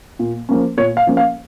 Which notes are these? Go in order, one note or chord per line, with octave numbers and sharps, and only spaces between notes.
A#2
F3 A#3 C#4
A#2 C#5
F5
F3 A#3 C#4
F5